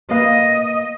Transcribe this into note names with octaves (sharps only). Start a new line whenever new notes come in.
A#3 B4 D#5 F5